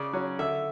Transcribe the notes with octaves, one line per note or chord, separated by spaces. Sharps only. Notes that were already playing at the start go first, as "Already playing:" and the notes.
Already playing: C#3 D5
F#3 C#4
D3 E5